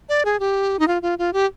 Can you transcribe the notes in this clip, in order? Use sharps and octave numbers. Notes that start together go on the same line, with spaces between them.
D5
G#4
G4
D#4
F4
F4
F4
G4